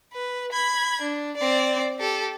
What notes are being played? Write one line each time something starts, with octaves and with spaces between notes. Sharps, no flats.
B4
B5 G#6
D4
C4 D5
G4 A4